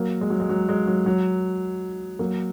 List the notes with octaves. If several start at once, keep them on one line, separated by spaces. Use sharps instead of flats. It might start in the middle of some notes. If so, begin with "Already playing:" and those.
Already playing: F#3 A#3
G#3
F#3
G#3
F#3
G#3
F#3
F#3
F#3 A#3